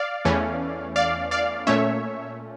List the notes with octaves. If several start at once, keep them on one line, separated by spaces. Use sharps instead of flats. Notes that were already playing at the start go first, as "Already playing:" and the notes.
Already playing: D5 F5
E2 E3 A3 C#4
D5 F5
D5 F5
A#2 A3 C#4 C#5 E5